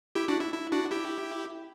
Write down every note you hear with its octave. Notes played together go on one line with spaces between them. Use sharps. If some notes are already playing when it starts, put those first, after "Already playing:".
E4 G4
D4 F#4
E4
E4
D4 F#4
E4 G4